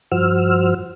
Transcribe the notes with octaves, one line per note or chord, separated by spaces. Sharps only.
G2 F3 F#4 C5 E6 F6